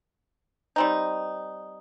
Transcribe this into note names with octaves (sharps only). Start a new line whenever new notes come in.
G3 C4 D#4